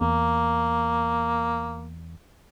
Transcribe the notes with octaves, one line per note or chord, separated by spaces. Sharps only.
E2 A#3